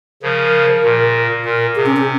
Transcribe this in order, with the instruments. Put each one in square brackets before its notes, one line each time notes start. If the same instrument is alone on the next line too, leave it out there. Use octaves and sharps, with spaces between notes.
[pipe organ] C#3 F3 [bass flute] A#4
[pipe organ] A#2
[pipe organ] A#2 [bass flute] A#4
[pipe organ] C3 [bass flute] G#4
[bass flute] C#4
C#4